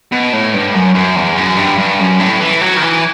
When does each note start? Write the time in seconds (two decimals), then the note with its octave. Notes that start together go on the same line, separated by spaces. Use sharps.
0.12 B2
0.33 A2
0.53 G2
0.74 F#2
0.95 F#2
1.16 E2
1.37 F#2
1.58 G2
1.78 G2
1.99 F#2
2.19 A2
2.40 E3
2.61 F#3
2.77 D#3
2.82 E3